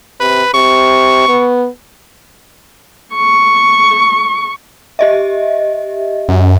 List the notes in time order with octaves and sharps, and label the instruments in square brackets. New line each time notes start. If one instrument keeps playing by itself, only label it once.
[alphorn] C3 [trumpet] B4
[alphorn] C3 [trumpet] C#6
[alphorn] B3
[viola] C#6
[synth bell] G4 D#5 E5
[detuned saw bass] F#2